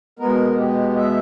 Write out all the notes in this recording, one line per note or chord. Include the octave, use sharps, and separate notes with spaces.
B2 G#3 B3 A#4
G4
E5